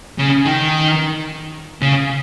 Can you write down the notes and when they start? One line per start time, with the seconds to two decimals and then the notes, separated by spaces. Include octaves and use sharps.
0.18 C#3
0.46 D#3
1.82 C#3